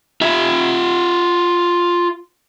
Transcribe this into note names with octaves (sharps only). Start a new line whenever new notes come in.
F4 E5